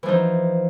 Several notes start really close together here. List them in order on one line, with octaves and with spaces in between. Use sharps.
E3 F3 D#4